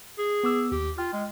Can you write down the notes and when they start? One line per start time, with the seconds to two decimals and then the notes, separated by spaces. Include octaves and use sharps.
0.18 G#4
0.44 B3 D6 E6
0.72 D#2 G4
0.98 F4 G5 F6
1.13 G#3